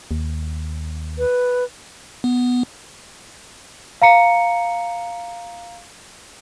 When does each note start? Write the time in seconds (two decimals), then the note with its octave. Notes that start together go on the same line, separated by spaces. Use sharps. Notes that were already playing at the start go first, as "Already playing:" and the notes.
0.11 D#2
1.19 B4
2.24 B3
4.02 F5 A#5 C#7